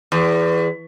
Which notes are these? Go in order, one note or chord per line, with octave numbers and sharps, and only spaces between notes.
E2